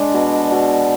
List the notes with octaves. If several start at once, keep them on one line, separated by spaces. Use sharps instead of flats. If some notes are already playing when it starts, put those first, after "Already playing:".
Already playing: G#3 D4
B2
B2